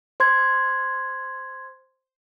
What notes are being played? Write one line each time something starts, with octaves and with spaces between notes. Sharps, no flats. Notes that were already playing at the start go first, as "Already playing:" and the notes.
C5 C6 G#6